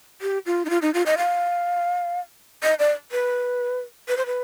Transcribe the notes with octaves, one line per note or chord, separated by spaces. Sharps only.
G4
F4
D#4
F4
D#4
F4
D#5
F5
D#5
D5
B4
B4
C5
B4